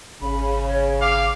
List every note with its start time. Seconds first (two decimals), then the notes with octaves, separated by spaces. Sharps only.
0.22 G#1 C#3 B5
0.67 C#5
1.01 F5 D6